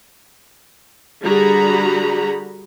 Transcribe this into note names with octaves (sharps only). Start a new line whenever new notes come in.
D3 G3 F#4 G#4 A#5 B5